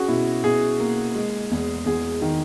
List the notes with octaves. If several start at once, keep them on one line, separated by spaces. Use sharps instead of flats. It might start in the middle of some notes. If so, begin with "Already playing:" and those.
Already playing: C#4 F#4 G#4
B2 E4
B2 G#4
A#3
G#3
E2
E2 G#4
D#3